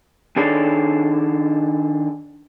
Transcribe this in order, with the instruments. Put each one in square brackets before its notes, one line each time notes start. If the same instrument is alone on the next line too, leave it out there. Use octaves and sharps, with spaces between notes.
[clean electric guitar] D#3 D4 G#4 A4 C#5 D5